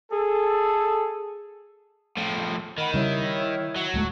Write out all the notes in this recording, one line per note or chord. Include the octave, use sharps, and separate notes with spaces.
G#4 A4
A2 F3
D#3 D#5 F#5 B5
C#3 G3 E4 C#5 E5
F#3
D1 G#3 A3